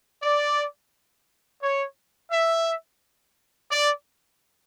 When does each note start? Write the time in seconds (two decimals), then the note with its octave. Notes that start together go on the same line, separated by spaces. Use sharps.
0.23 D5
1.62 C#5
2.31 E5
3.70 D5